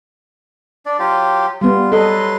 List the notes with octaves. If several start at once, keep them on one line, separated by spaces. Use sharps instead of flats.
D4 D5
F#3 F4 G4
G3 B3 F4
F#3 A4 B4 D#5 C6